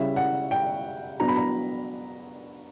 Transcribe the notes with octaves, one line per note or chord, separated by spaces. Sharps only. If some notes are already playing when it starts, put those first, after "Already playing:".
Already playing: C#3 G3 C#4 E4 E5
F#5
G5
F#3 B3 D4 A#5
B5
A#5